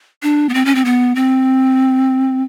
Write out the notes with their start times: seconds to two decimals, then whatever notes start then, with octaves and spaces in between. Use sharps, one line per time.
0.23 D4
0.49 B3
0.54 C4
0.65 C#4
0.75 C4
0.85 B3
1.15 C4